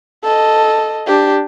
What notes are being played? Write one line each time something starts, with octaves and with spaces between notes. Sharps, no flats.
A4 D#5
D4 G4